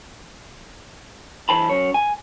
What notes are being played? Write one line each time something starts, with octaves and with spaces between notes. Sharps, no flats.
E3 C5 A5 B5
F#2 C#5
G#5